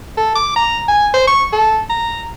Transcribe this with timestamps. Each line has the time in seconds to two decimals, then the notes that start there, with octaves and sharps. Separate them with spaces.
0.17 A4
0.35 D6
0.56 A#5
0.88 G#5
1.14 C5
1.28 C#6
1.53 A4
1.90 A#5